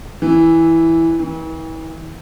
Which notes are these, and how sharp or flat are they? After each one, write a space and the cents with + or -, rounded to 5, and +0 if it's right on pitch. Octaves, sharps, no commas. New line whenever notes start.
E3 -5
E3 -40